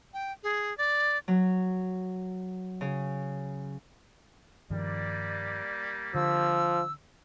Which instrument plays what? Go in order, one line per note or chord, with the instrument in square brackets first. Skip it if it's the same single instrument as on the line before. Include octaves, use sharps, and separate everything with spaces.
[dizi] G5
G#4
D5
[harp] F#3
C#3
[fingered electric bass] G2 D#3 F3 [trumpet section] G3 A#3 [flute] D5
[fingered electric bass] D3 [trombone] F3 [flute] E6